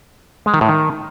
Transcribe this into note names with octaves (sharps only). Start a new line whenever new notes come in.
G#3
D#3
A2
D#3